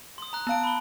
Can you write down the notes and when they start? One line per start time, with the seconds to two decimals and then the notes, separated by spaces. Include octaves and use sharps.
0.18 C6 D#6
0.33 A#5 F#6
0.47 B3 F5 A5 D7
0.64 B5 G7